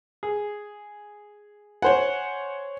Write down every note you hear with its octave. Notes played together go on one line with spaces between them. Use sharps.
G#4
C5 C#5 F#5 G#5